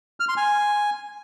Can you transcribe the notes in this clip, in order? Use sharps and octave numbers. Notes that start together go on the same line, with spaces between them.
F6
C6
G#5